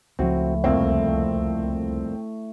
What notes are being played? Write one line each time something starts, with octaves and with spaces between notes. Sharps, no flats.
C#2 A2 F3 C4 F#4
C2 F2 A3 A#3 C4